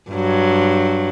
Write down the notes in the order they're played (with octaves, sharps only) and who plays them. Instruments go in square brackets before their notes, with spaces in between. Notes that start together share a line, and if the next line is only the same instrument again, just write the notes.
[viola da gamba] G2 F#3